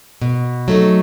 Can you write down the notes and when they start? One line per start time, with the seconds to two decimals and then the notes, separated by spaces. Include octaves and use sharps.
0.22 B2
0.68 F#3 A3 D#4